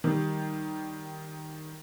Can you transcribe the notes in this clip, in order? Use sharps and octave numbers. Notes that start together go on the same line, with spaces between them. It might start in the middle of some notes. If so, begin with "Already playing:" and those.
D#3 G3